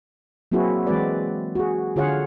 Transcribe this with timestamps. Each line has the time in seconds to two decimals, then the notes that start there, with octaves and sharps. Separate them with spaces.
0.52 F#3 A#3 C4 E4 F#4 G#4
0.86 E3 G#3 C4 F#4 B4 D5
1.55 F#4 G#4
1.96 D3 F4 G#4 C#5 F5 F#5